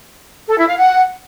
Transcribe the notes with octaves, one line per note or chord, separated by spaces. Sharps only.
A4
E4
F5
F#5